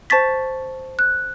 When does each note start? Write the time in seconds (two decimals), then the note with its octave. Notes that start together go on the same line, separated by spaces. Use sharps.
0.10 C5 A5 C#6 A6 B6
0.99 F#6